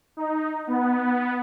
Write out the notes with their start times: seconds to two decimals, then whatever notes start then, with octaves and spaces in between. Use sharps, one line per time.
0.17 D#4
0.67 B3